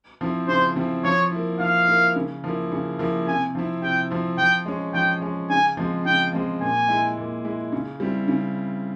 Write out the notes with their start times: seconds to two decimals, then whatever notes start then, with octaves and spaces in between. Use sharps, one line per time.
0.21 F3 C4 E4
0.48 C#3 C5
0.76 F3 C4 E4
1.04 F3 C#5
1.31 A#3 E4
1.60 F3 F5
1.88 A#3 E4
2.16 C#3
2.44 F3 A#3 E4
2.72 C#3
2.99 F3 A#3 E4
3.27 C3 G#5
3.55 F3 C4 E4
3.82 C3 G5
4.11 F3 C4 E4
4.38 F3 G5
4.66 G#3 C#4
4.94 F3 G5
5.22 G#3 C#4
5.50 C#3 G#5
5.77 F3 G#3 C4
6.06 C#3 G5
6.33 F3 G#3 C4
6.61 A#2 G#5
6.89 G#3 E4
7.17 A#2
7.45 G#3 E4
7.72 C#3
8.00 G3 C4 E4
8.28 C#3